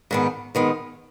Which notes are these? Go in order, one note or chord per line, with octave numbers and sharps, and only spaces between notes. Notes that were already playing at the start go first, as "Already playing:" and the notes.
G#2 D#3 B3
G#2 D#3 B3